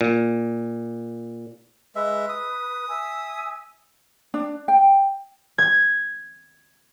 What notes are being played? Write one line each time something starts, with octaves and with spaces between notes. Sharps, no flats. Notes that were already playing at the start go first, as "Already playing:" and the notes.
A#2
G#3 B4 E5
D#6
E5 G#5 E6
D4
G5
G#6